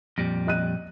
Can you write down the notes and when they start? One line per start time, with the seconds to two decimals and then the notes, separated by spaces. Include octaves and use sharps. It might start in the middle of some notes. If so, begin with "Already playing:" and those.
0.18 F2 A#2 G3
0.47 D#5 F#6 D#7